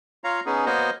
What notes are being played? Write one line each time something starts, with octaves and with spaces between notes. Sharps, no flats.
F4 C#5 F5 A#5
B3 C#4 D#4 G#4
A#3 B3 F#4 C5 C#5 D#5